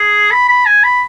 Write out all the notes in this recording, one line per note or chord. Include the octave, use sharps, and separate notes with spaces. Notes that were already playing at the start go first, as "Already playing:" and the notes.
Already playing: G#4
B5
B5
G#5
B5